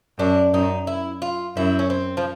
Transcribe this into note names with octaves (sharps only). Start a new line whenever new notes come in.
F#2 D4
F#2 D#4
E4
F4
F#2 E4
C#4
C4
F3